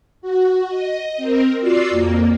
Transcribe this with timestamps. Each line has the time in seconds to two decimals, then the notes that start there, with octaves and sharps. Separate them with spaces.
0.22 F#4
0.69 D#5
1.17 C4 A#4
1.61 F4 F#4 D5 E6 C7
1.90 F2 A#3